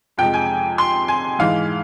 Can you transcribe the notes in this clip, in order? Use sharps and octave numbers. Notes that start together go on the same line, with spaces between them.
F2 C3 F3 G#3 G5
G#5
C6
G#5
G#2 E3 G#3 F5